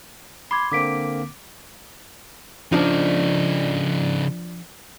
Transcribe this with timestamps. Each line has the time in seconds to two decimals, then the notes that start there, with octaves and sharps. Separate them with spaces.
0.51 B5 C6 D6 G#6
0.72 D3 A#3 C4 D6 B6 D7
2.72 C#3 F3 D4 D#4